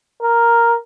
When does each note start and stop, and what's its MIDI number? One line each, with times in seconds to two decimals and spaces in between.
0.22 0.76 70